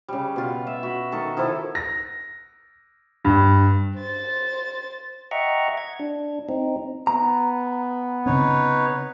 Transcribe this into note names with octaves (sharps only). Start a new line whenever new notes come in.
C#3 G3
B2 F4
E5
F#4 B5
D#3 A4 C#6
D#3 F3 E4 A4
A#6
G2
C5 A6
D#5 E5 F#5 G5 A#5 C#6
G#6
D4
C4 D#4
B3 A#5
C#3 C4 D#4 B4 C#5